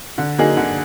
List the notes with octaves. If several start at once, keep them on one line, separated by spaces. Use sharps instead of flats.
D3
F#3 A#3 D#4 G#4
D3